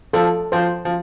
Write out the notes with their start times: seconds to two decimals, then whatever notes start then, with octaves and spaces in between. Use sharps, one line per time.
0.13 F3 A4
0.52 F3 C5
0.85 F3